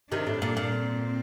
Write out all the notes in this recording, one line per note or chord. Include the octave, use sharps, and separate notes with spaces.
C3 D#3 D4
A2
A#2
A#2
C4